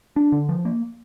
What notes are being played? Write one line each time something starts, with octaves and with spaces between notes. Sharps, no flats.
D4
D3
F3
A#3